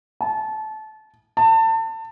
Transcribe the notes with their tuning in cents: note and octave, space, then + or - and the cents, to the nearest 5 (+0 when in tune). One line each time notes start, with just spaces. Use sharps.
A5 -25
A5 +30